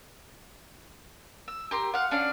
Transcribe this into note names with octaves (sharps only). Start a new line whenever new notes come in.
E6
G4 A#4 C6
F5 F#5
C#4 D4 D5 F5